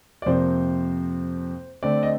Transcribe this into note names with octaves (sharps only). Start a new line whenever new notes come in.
D5
F2 C3 F3 A#3 C5
D3 A3 C4 D5
D#5